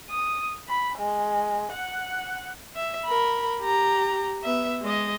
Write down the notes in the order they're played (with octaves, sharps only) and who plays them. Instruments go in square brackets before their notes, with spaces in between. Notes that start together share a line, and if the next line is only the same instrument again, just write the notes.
[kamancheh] D#6
B5
G#3
F#5
[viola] E5
A#4 B5
G4 A#5
B3 E5
G#3 D#5